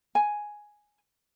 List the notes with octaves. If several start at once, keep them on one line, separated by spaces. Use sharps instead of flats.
G#5